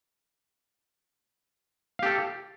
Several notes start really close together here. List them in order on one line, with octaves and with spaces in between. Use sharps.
F5 G4 A4